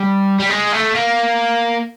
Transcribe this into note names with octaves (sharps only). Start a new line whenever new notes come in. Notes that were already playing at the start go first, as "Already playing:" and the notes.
Already playing: G3
G3
G#3
A3
A#3